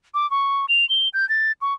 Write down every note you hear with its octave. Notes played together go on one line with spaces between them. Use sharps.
D6
C#6
F7
G7
G6
A6
C#6